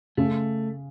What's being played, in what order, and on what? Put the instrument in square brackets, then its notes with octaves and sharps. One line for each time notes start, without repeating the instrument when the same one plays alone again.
[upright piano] C#3 [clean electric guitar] A3